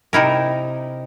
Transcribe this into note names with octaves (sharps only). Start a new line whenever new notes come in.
C3 D#4 E4 A#4